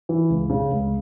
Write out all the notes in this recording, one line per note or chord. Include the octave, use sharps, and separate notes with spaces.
E3
C#2
C#3
C#2